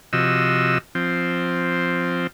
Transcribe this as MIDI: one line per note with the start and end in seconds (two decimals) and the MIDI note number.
0.13 0.78 48
0.13 0.78 53
0.13 0.78 66
0.13 0.78 75
0.13 0.78 88
0.95 2.27 53
0.95 2.27 60